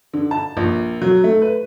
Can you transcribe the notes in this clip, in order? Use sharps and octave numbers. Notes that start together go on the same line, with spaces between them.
D3
A5
A#1
F#3
A3
B4